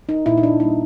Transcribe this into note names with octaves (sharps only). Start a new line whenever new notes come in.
D#4
A#2 E4
D#4
D4
G3 A#3 D#4